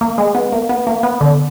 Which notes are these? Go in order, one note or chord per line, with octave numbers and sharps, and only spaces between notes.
A#3
G#3
B3
A#3
B3
A#3
B3
D3